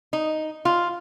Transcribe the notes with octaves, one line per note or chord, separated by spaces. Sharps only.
D#4
F4